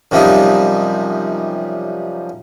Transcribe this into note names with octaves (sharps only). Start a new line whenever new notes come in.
F#2 C3 F3 G3 D#4